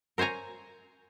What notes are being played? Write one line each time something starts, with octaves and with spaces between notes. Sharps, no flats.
A#4 C5 C#5 G#5 A#5